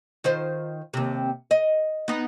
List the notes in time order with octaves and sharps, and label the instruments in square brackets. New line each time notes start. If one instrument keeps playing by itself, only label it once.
[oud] D#3 F4 C5
D#2 C3
D#5
B3 D#4